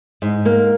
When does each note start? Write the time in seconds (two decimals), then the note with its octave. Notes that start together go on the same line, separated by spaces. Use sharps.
0.22 G#2
0.45 A#3